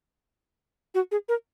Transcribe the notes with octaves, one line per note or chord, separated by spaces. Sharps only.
F#4
G#4
A#4